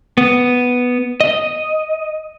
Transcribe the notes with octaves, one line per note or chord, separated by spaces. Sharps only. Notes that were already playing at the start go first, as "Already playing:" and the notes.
B3
D#5